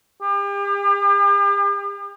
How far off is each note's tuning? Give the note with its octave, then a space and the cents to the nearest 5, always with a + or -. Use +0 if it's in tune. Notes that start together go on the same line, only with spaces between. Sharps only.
G4 +40